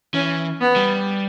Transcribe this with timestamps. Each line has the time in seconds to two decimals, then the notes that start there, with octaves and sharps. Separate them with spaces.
0.14 E3 C#4
0.61 B3
0.76 G3